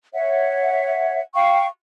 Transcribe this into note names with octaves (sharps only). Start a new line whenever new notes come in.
C#5 E5 F#5
F5 G5 C#6